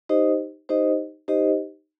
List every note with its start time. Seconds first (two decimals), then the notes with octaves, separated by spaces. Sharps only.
0.09 D#4 G4 C5 D#5
0.69 D#4 G4 C5 D#5
1.28 D#4 G4 C5 D#5